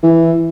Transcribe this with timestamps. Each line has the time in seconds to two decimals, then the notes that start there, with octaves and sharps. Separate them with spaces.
0.03 E3